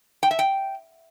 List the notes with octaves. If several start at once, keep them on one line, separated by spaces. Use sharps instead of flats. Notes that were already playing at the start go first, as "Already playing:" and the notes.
G5
E5
G5